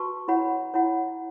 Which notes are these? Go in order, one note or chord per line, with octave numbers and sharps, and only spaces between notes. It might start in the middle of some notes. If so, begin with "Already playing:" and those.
Already playing: F#4 B4 A5 C#6
E4 C#5 F#5 B5
E4 C#5 F#5 B5